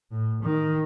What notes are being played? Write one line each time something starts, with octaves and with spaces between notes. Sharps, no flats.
A2
D#3